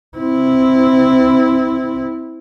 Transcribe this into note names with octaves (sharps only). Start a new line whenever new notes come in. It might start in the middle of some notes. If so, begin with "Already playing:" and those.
C4 E4